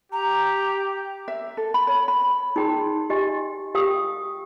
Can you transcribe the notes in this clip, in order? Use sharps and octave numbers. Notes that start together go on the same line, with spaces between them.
G4 A#5
E5
A4
B5
C#5
B5
D#4 G#4 G5 A#5 C6
G4 D#5 G#5 C6
G4 F5 G5 D#6